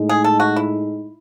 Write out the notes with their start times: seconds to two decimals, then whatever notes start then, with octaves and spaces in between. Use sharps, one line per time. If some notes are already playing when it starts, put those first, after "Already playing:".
Already playing: A2 G#3 D#4
0.09 G#4
0.24 A4
0.40 F#4
0.56 E4